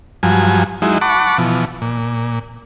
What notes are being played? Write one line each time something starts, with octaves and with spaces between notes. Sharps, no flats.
G2 F3 F#3 G#5
F#3 G#3 D#4 E4
F#5 A5 B5 C#6 D6
B2 E3 F3
A#2